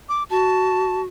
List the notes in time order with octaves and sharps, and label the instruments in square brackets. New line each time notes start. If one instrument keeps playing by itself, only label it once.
[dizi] D6
[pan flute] F#4 [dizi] A5